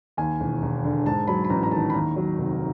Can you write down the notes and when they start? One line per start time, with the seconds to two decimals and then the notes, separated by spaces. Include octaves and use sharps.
0.17 D#2 G#5
0.40 E1
0.62 E1
0.84 D3
1.06 G#2 A5
1.27 F#3 B5
1.44 B5
1.50 A1 A#5
1.63 A#5
1.71 D#3 A5
1.90 B5
1.94 D#2 A#5
2.16 F#3
2.38 F1